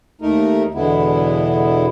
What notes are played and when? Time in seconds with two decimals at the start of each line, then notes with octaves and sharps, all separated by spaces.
0.21 D#2 A3 D#4 A#4
0.75 E2 B2 D3 G#3 B3 E4